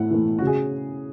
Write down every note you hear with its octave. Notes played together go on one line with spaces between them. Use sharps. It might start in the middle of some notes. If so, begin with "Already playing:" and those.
Already playing: A2 E3 A3 F#5
E3 A3
C#3 F#4
G#4